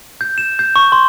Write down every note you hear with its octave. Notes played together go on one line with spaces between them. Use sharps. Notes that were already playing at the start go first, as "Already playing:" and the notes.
G6
E7
G6
C#6
C6